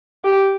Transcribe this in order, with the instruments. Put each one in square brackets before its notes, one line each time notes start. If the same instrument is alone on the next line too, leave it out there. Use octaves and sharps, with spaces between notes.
[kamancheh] G4